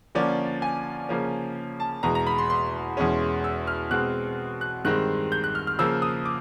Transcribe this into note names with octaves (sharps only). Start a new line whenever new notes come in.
D3 F3 A#3 C#4 D5
G#5
C#3 F3 A#3 C#4
A5
E2 B2 G#3 A#5
A#5
B5
C6
C6
E2 B2 G#3 C#4
E6
F6
B2 G#3 C4 F#6
F#6
G2 D#3 G#3 C4 F#6
G6
F#6
F6
F6
C#3 F3 A#3 E6
D#6
D6